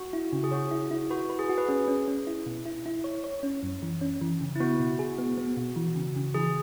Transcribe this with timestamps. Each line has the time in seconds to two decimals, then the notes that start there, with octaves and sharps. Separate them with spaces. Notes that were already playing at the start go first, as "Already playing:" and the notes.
Already playing: F#4
0.13 E4
0.33 C#3
0.44 G#4
0.51 F#4 C#5
0.71 E4
0.91 E4
1.10 F#4 B4
1.29 B4
1.39 G#4
1.49 F#4
1.58 B4
1.69 C#4 G#4
1.88 C#4
2.08 C#4
2.27 E4
2.46 B2
2.66 E4
2.86 E4
3.04 C#5
3.24 C#5
3.43 C#4
3.63 F#2
3.82 E3
4.01 C#4
4.21 E3
4.41 C#3
4.56 E4
4.60 B3 F#4
4.80 B2
4.99 G#4
5.18 B3
5.38 B3
5.57 B2
5.76 E3
5.96 C#3
6.16 C#3
6.34 E3 G#4